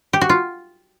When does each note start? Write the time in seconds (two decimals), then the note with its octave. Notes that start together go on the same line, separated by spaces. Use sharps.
0.13 G4
0.21 F#4
0.29 F4